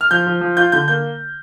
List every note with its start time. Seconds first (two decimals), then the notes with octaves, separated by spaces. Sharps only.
0.01 F6
0.11 F3 G6
0.27 F3
0.41 F3
0.57 F4 G6
0.72 D3 G6
0.88 A#3 G6